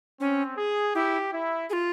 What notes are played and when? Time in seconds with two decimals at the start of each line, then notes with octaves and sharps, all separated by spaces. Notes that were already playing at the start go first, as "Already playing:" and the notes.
0.20 C4 C#4
0.57 G#4
0.95 E4 G4
1.32 E4
1.70 G#4
1.73 F4